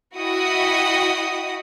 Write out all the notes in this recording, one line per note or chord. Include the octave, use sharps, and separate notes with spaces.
E4 F#4 D#5 F#5 G5 D#6